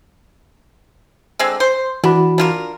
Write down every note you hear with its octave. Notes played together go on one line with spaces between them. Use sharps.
D3 G#3 C4
C5
E3 D4 F#4 B5
D4 F4 A#4